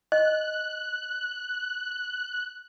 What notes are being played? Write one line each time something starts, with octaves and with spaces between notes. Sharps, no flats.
D#5 F#6